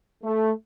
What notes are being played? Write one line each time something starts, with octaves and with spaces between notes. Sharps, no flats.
A3